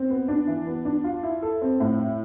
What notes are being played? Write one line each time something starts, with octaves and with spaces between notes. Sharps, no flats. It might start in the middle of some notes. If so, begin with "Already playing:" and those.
Already playing: C4
B3
D4
E3
B3
D4
F4
E4
A4
C4
A2
E4